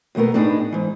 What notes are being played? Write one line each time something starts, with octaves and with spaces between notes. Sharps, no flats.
D#2 B2 A3 B3 A#4
A2 B3 D4 D#4 G#4
G#2 E3